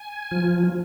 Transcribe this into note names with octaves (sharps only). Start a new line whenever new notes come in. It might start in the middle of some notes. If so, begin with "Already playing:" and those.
Already playing: G#5
F3